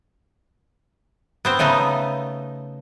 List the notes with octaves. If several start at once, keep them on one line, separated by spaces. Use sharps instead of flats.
B3 C4 C5
C#3 A3 B3 D#4